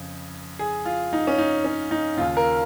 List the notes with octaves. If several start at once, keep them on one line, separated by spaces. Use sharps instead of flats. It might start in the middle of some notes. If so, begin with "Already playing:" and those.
Already playing: F2 C#3
G#4
F4
D#4
C#4
D#4
C#4
D#4
D#2 C#3 F4
A#4